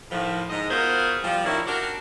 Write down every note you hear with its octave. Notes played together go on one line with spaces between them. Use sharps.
A2 D#3 F3
G#2 D#5
B3 F4 F#4 G#4 A#4 C5
F3 G3
D#3 F3 C#4 E4
D4 F#4 G4 A#4